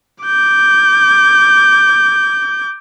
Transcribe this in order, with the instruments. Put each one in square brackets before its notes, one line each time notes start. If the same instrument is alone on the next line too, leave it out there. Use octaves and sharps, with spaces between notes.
[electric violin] D6 G6